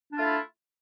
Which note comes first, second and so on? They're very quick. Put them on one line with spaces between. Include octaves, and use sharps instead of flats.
D4 F4 A3 E4